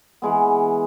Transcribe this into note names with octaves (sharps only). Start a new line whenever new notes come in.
E3 G#3 B3